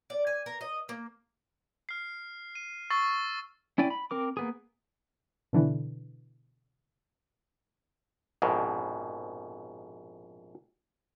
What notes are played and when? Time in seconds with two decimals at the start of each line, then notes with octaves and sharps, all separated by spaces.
0.10 D5
0.27 G#5
0.46 A#4
0.61 D#5
0.89 A#3
1.89 F6 C7
2.55 D#7
2.90 C#6 E6 A6 C7
3.78 C#4 E4 D5 G5 G#5
3.90 B5
4.11 C4 A#4 D6
4.37 A#3 B3 G#4
5.53 B2 D3 E3
8.42 A#1 F2 G#2 B2